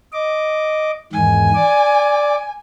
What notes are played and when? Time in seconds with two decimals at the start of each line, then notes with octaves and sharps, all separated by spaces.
0.13 D#5 D6
1.13 E2 G#2 D#3 G#5
1.55 D5 D6